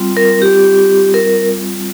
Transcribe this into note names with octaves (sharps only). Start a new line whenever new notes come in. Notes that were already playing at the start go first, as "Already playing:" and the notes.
Already playing: G3 C4 F4
A#4
G4
A#4